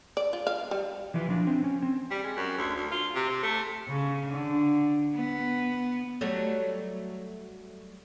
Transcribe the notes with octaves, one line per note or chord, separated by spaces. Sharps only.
D5
F4
F5
G3
E3 F3 E4 B4
F3 F#3 D4
C4
C#4
C4
G3
G#3
F#2
D2
D2
F4
C3
C3
A3
C#3
D3
B3
F#3 G3 A3